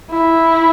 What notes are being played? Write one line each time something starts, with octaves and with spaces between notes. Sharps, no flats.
E4